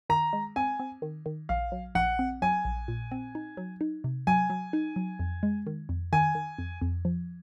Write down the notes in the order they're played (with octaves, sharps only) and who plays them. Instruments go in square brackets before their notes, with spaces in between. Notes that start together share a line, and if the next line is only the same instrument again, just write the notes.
[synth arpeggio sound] D#3 [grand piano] A#5
[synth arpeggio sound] G#3
[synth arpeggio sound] C4 [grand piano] G#5
[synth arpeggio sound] C4
D#3
D#3
[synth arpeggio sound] A#1 [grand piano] F5
[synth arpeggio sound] F#3
[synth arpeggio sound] A#1 [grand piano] F#5
[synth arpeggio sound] C4
[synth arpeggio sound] F#3 [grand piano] G#5
[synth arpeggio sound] A#1
A#2
C4
D#4
F#3
D#4
C3
[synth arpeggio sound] F#3 [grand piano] G#5
[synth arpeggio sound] F#3
D#4
F#3
F2
G#3
D#3
F2
[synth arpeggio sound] D#3 [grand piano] G#5
[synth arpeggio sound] D#3
F2
F2
F3